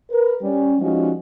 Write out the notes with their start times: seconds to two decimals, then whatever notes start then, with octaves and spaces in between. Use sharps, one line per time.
0.11 A#4 B4
0.42 G3 C#4
0.81 F3 G3 G#3 C#4 D#4 F#4